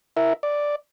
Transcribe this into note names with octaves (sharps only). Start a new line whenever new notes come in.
E4 A#4 E5
D5